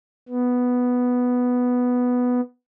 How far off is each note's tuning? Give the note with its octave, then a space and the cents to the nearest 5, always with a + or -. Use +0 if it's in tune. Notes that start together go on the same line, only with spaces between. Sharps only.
B3 +0